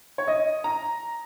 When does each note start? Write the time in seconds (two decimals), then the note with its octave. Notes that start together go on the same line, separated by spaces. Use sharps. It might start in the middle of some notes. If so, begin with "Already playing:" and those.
0.18 C#5
0.28 D#5
0.64 A#5